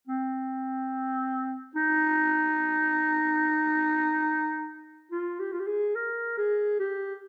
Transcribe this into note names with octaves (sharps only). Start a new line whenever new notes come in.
C4
D#4
F4
G4
F4
G4
G#4
A#4
G#4
G4